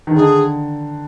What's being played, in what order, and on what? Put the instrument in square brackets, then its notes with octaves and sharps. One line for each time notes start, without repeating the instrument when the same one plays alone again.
[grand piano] D#3
[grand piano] D3 [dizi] G#4